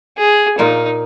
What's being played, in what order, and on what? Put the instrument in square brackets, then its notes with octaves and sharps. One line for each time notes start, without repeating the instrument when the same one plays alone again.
[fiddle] G#4
[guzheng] A#2 A#3 F4 [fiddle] D#4